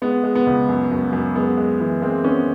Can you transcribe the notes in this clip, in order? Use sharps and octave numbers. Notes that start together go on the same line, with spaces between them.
G#3 B3
G#3
B3
C#2
F#2
F#2
F#2
G#3 B3
G#3
E3
G#3 A#3 C4
D#3 B3 C#4